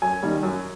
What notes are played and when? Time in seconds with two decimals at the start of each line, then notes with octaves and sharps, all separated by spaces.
0.02 F#2 G#5
0.23 D#3 G3
0.43 F#2